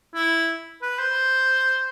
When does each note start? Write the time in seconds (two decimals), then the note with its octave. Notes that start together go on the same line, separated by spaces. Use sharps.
0.15 E4
0.82 B4
0.99 C5